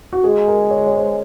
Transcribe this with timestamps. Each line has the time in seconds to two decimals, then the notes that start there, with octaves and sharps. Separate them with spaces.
0.13 F#4
0.24 G#3 G#4
0.48 A#4
0.71 C#5
0.87 C#5
0.95 C5